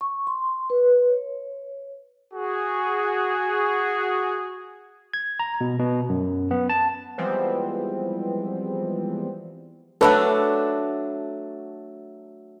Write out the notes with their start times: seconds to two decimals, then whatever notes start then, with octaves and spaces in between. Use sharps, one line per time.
0.01 C#6
0.27 C6
0.70 B4
1.09 C#5
2.34 F#4 G#4
5.13 G#6
5.40 A#5
5.61 B2
5.79 B2
6.09 F#2
6.51 B3
6.70 A5
7.18 E3 F3 G3 G#3 B3 C4
10.01 F#3 A3 D4 A4 B4